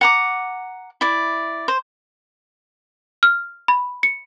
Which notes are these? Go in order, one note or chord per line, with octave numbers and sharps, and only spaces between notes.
F#5 A#5 D6
E4 D5
C5
F6
B5
C#7